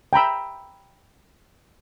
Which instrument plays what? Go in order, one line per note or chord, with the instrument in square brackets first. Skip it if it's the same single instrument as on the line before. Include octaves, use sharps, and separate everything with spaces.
[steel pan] G5 A#5 B5 E6